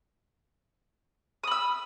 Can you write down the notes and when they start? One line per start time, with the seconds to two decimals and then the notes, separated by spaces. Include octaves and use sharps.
1.44 D#6
1.47 B5
1.51 E6